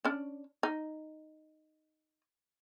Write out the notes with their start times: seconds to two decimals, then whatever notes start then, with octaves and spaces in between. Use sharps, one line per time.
0.05 C#4 D4
0.63 D#4